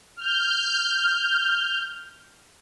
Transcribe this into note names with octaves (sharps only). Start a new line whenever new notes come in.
F6 G6